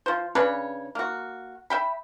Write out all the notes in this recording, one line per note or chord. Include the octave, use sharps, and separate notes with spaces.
F3 C5
C#3 D4 B4 C#5
A#3 F#4
E5 G5 B5